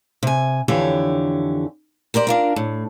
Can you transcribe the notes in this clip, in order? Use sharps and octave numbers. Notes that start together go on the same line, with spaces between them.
C3 G#5
F2 D3 E3 G4 C#5
G4 A#4 C5 D5
D4 F4 A#4
A2